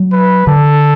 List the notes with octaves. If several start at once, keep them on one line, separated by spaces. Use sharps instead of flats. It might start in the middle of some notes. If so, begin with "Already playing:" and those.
Already playing: F#3
B4
D3 A4